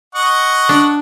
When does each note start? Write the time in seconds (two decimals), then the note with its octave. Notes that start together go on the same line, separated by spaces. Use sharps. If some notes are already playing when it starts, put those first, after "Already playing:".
0.15 D#5 F#5 C#6
0.69 D4